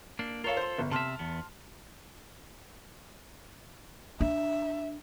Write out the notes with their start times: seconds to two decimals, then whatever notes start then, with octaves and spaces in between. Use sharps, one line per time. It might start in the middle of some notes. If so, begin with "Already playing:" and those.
0.19 A#3 D4
0.44 F4 A4 A#4 C#5 F5
0.57 C5 C6
0.78 G1
0.91 C3 E5 A5 C6 F6
1.19 E2 B3
4.20 D4 E5